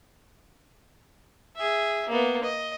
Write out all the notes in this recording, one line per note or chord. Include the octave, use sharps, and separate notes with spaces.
G#4 E5
A#3 B3
D#5